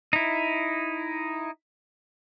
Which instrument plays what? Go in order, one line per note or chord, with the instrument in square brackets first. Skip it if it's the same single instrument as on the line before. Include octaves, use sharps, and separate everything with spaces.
[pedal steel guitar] D#4 E4